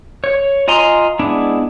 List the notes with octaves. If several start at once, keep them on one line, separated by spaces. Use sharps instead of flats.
C#5
F4 D#5 G#5 A#5 C6
G#3 B3 D4 E4